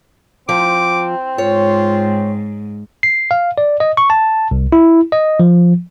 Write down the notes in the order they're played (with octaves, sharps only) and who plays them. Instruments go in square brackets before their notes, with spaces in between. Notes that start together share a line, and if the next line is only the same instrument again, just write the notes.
[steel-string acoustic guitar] F3 [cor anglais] C4 [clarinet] D6
[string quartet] G#2 [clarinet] F4 [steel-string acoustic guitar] C#5
[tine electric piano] C7
F5
D5
D#5
C#6
A5
C2
E4
D#5
F3